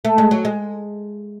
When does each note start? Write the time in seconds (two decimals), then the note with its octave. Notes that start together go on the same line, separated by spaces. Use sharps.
0.05 A3
0.18 G#3
0.31 F#3
0.45 G#3